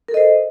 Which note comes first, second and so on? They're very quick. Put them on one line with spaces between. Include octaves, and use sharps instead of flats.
A#4 A4 D#5 C5